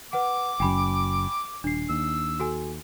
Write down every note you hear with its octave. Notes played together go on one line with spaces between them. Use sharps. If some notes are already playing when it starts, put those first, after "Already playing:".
B4 F#5 D6
F#1 F#2 G5 G#5 B5
D#1 D4 C7
D#2 E6
F#4 A4 G#5